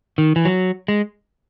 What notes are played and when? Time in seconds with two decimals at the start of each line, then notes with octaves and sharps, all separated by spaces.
0.18 D#3
0.36 E3
0.45 F#3
0.88 G#3